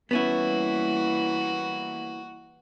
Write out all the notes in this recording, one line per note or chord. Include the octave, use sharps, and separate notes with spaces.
E3 G3 A#3 B3 C#4 E4 F#4